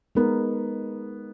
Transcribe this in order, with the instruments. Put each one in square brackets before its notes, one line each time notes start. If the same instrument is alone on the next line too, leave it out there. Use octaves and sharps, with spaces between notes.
[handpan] G#3 D#4 A#4 [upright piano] B3